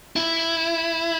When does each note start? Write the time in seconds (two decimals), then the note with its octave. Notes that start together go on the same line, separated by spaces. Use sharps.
0.16 E4